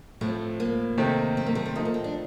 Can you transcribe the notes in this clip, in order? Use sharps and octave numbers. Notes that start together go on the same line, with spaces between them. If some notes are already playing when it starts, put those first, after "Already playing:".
A2 F3 A3 C4
A#3
C3 D#3 A3 C4 G4
C4
A#3
A3
C4
F3 A3 A#3 D#4
A#3
C4
D4